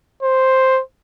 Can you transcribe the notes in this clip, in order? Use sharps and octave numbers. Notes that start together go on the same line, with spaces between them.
C5